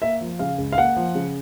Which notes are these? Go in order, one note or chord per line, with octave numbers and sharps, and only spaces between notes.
A#3 E5
F3
C#3 F5
C#2
F5
A#3 F#5
F3
C#3